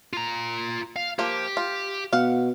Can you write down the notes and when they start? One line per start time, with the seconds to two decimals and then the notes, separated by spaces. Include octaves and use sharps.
0.13 F4 A#5
0.96 F5
1.19 F3 A#3 G4
1.57 F4
2.13 B2 F5 F#5